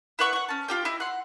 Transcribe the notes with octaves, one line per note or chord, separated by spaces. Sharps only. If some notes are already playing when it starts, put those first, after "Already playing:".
E4 B4 F#5 C#6
F#5 C#6
C#4 A5
F4 G4 G5
E4 D#5 F6
F#5 C6